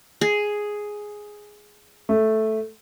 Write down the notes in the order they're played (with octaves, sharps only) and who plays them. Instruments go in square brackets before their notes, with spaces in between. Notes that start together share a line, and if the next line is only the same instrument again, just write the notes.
[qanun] G#4
[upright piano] A3